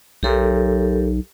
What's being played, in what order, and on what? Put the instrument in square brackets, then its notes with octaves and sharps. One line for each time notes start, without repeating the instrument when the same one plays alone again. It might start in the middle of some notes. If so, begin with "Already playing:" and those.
[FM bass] B1 [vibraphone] G4 A4 A#4